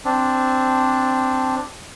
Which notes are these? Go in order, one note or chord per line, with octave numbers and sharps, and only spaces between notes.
C4 D4